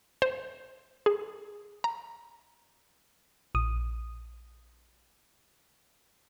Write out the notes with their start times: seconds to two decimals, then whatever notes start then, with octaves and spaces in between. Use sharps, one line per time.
0.22 C5
1.06 G#4
1.84 A#5
3.55 A#1 D#6